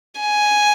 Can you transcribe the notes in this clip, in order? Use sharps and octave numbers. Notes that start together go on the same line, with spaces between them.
G#5